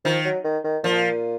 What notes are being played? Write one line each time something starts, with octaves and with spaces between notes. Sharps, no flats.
D#3 F3
F#3
D#3
D#3
A#2 F3